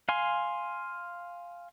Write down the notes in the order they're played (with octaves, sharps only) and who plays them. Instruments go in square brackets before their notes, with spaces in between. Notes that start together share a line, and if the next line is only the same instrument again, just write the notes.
[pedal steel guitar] F5 G#5 C6